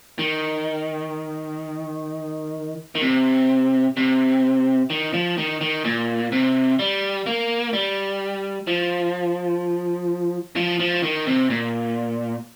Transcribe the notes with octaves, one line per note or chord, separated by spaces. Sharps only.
D#3
D#3
C3
C3
D#3
F3
D#3
D#3
A#2
C3
G3
A#3
G3
F3
F3
F3
D#3
C3
A#2